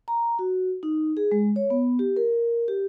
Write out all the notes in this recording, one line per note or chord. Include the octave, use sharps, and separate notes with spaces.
A#5
F#4
D#4
G#4
G#3
C#5
B3
G4
A#4
G4